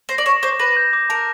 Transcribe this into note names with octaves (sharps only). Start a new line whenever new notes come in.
C5 A#6
D5
C#5 E7
C5 D6
B4 A#6
G6
D6
A#4 A5